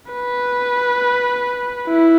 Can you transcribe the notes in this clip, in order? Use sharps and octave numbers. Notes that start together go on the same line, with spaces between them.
B4
E4